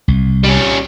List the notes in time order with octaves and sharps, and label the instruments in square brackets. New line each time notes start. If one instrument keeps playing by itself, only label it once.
[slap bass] C2
[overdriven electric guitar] G3 C#4